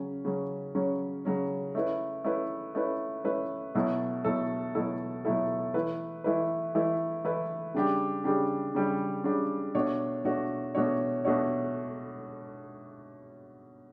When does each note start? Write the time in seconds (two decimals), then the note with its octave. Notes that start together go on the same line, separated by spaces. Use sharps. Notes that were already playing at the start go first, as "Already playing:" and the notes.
Already playing: C#3 F#3 C#4
0.25 C#3 F#3 C#4
0.75 C#3 F#3 C#4
1.25 C#3 F#3 C#4
1.75 A3 C#4 E4 B4
2.24 A3 C#4 E4 B4
2.75 A3 C#4 E4 B4
3.24 A3 C#4 E4 B4
3.75 B2 F#3 A3 E4 A4
4.24 B2 F#3 A3 E4 A4
4.75 B2 F#3 A3 E4 A4
5.25 B2 F#3 A3 E4 A4
5.74 E3 A3 E4 B4
6.24 E3 A3 E4 B4
6.75 E3 A3 E4 B4
7.25 E3 A3 E4 B4
7.74 C#3 G3 D4 G4
8.24 C#3 G3 D4 G4
8.75 C#3 G3 D4 G4
9.24 C#3 G3 D4 G4
9.75 B2 A3 D4 F#4 C#5
10.25 B2 A3 D4 F#4 C#5
10.75 B2 A3 D4 F#4 C#5
11.25 B2 A3 D4 F#4 C#5